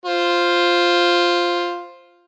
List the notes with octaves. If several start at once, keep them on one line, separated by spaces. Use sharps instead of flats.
F4 C5